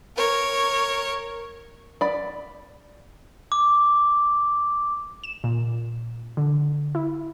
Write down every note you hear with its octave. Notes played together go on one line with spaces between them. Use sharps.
A#4 C#5
D5 B5
D6
E7
A#2
D3
E4